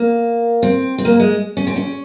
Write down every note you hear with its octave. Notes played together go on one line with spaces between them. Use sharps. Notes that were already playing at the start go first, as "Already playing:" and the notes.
Already playing: A#3
C4
C4
A#3
G#3
C#4
C4
C#4